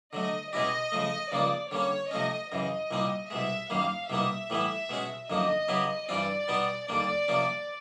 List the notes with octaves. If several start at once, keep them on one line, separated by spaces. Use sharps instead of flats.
D3 F#3 A3 D#5
B2 G#3 C#4 E4 G4 D#5
C#3 F3 A3
C#2 C#3 F3 A#3 D#4 D5
D3 G3 A#3 C#4 C#5
C3 F3 A3 C#4 D#5
F#2 C#3 E3 D#5
C2 A#2 G3 C4 D#4
C2 B2 G#3 E5
F#2 D#3 G3 A#3 F5
C2 B2 G3 A#3 D#4 E5
A2 E3 G3 B3 E4
B2 G#3 C#4 F#4
F#2 D3 F3 A#3 D#4 D#5
C#3 F#3 B3 E4 G4
G2 E3 G3 C4 F4 D5
B2 G3 B3 D#4 F#4
D#2 D3 G3 A#3 D4 D5
C3 F3 A#3 C#4